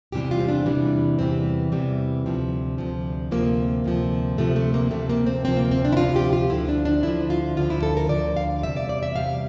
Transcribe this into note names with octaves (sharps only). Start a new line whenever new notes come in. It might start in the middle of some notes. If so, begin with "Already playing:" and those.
E2 C3 E3 G3 G4
F4
C4
D4
E2 C3 E3 G3
E2 C3 E3 G3 C4
E2 C3 E3 G3
D2 C3 F3
D2 C3 F3
D2 C3 F3 A#3
D2 C3 F3
D2 C3 F3 A3
A3
A#3
D2 C3 F3 A3
A#3
C4
D2 C3 F3 C4
A#3
C4
D4
E4
D2 C3 F3 F4
G4
F4
D2 D3 F3 E4
D4
D4
D2 D3 F3 E4
F4
D2 D3 F3 F4
E4
A4
A#4
D2 D3 F3 D5
F5
E2 C3 G3 E5
D5
D5
E5
E2 C3 G3 F5